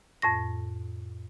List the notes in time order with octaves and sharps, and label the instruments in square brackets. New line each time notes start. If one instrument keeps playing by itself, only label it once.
[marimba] F2 A2 A#6